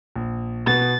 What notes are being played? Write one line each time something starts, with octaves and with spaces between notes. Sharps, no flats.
A#1
B2 B3 A6